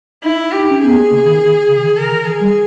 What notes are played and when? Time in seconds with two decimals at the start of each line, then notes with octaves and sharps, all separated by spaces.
0.23 D#4 E4
0.52 G4
0.59 D#4
0.71 C#4
0.81 B3 G#4
0.96 A#3
1.11 C#3
1.24 D#3
1.68 C#3
1.82 D#3
1.97 C#3 A#4
2.11 D#3
2.25 E3 G#4
2.40 G3